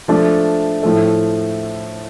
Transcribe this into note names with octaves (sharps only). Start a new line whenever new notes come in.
F3 A3 D4
A2 F3 A3